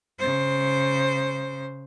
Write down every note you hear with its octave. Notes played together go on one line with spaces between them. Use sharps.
C#3 C5